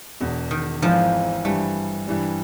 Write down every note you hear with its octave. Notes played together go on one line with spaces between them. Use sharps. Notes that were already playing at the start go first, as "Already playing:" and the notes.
E1 E2 B2
D#3
G#1 G#2 E3 F3
G2 E3 G3 A3
G2 E3 G3